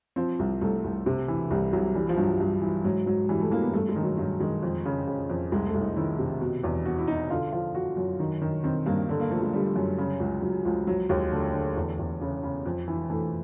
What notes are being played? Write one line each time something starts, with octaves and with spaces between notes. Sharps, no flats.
F3 C4
C2
C2 A3
C2
C3
E3
C2 G3
C2 F#3
E3 G3
F3
G2 F#3
G2
E3
G#2 F#3
G#2 F#3
E3 G3
A3
E3 A#3
B3
G2 A3
G#3
D#3
F#3
G2 F#3
D#3 G#3
F2
C#3
C#3
F2
C2 G#3
A3
C2
D#4
D#3 E4
C3
B2
E2
B2 F#4
E4
B2 D#4
D3 F4
F3 F4
F3 F#4
F#2
D#3
D#3
D#3 C4
G2 A#3
D3
A#3
F3 A3
G#3
D3 G3
F#2
C#3
C#2
C#2 F#3
C#2 F3
F3 F#3
D#2 G#3
D3 A3
D3
E2
E2
C#3
C#3
F2
E3
E3 A3